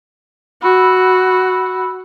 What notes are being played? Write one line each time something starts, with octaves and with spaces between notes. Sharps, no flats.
F#4 B5 E6